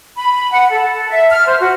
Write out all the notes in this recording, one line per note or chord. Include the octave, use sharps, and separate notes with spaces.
B5
F#5
A4
E5
F6
C5
F#4